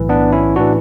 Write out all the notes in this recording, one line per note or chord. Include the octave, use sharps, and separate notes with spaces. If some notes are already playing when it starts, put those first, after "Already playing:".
Already playing: B1 A2 E3
B3 D4
C#4 E4
A2 E3 D4 F#4